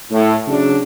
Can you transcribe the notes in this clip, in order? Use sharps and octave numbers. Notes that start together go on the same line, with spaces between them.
A2
C#3 F#3 D4